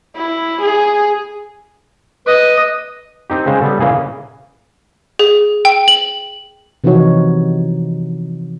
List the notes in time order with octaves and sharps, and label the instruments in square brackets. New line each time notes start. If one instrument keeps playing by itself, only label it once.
[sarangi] E4
G#4
[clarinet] B4 [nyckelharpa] D#5
[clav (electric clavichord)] C4 D#4 G4
C#3 G#3 C5
G3 B3 A4
C#3 E3 A#3 G#4
[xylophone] G#4
G5
F#7
[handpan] C3 E3 F3 D#4 F#4 C#5